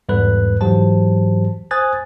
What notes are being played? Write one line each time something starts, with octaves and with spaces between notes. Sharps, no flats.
E2 G#2 G3 A4 B4 F#6
G#2 E3 F#3 G4 C5 A5
C5 G#5 D#6 F#6 G#6 A6